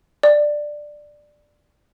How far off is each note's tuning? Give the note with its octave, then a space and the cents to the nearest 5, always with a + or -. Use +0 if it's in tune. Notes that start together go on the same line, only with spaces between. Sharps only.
D5 +10